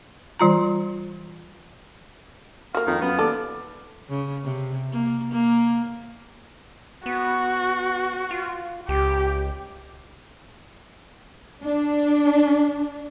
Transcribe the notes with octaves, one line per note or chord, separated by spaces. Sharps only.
E3 G3 F4 A#5
A#3 F#4 F5
F2 D#3
F#2 B3
D#2 A4 D5
C#3
C3
A#3
A#3
B3 F#4
F4
C#2 G4
D4